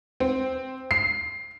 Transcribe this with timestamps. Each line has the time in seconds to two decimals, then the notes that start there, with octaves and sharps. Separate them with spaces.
0.20 C4
0.91 C7